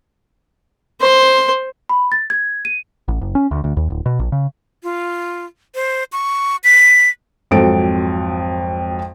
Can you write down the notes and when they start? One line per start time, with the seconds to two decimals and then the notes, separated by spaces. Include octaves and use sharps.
1.01 C5 C6
1.89 B5
2.12 A6
2.30 G#6
2.65 D#7
3.08 A1
3.21 F#1
3.35 C#4
3.51 D2
3.64 D2
3.77 D#2
3.90 D1
4.06 B2
4.19 A#1
4.32 C#3
4.83 F4
5.75 C5
6.12 C#6
6.64 B6
7.51 G#1 F2 F#3 A4 D7